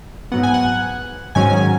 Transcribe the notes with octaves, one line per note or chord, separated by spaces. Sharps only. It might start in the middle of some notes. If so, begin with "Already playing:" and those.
G#2 F#3 B3 F#5
G#5
F#5
G#2 D#3 F#3 C#4 G#5